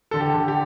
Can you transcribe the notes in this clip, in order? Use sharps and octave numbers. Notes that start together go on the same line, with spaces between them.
D3 A4
G4
D3
G4